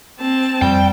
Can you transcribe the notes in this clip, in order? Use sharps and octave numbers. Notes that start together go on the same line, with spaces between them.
C4 A5
F2 G3 G5